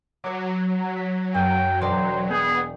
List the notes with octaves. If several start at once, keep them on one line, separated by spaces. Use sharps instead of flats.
F#3 C#5 D6
B6
F#2 G5
E1 C5 D5 G5
B3 G#4 G6